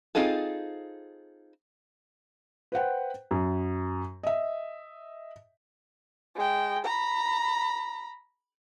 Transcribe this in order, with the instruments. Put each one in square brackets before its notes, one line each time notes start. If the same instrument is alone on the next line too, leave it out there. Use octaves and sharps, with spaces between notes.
[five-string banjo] C4 D#4 F4 G#4 A4
[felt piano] B4 C5 F#5 G5
F#2
D#5 E5
[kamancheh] G#3 G5
A#5 B5